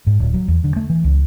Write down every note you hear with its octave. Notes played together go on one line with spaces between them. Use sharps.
G#2
D1
F#3
E2
D3
A3
E3
C#2